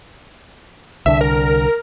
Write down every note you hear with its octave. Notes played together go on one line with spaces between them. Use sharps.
C2 D3 E5
A#4